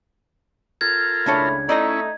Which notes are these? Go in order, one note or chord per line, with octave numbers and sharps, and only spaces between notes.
F4 A4 A#4 G#6
C#2 A2 D4 C#5 B5
A3 C#4 D#4 E4 D5 D#5 A#5